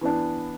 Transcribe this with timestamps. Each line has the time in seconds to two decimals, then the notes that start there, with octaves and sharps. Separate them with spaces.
0.01 E3 B3 D4